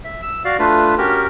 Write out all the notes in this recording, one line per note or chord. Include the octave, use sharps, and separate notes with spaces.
E5
E6
F#4 D5 F5
A3 D4 F4 B4
C#4 F#4 G4 A#4